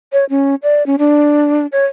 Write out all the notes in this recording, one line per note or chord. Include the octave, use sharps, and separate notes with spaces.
C#5
C#4
D5
C#4
D4
C#5